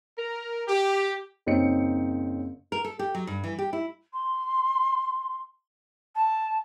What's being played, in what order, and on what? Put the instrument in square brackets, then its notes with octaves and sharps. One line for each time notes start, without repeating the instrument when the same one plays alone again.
[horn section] A#4
G4
[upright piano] F#1 C4 D#4 C#5 C#7
[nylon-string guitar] A#4
A4
G4
F#3
G2
E3
G4
E4
[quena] C6
A5